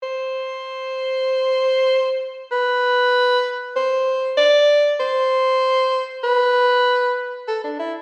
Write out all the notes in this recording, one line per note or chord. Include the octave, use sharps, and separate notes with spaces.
C5
B4
C5
D5
C5
B4
A4
D4
E4